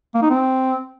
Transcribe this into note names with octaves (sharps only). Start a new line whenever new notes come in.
A#3
D#4
C4